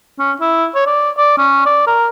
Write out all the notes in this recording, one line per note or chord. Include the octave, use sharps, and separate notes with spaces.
C#4
E4
C#5
D5
D5
C#4
D5
A#4